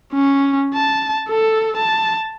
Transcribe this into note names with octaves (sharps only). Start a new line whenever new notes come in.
C#4
A5
A4
A5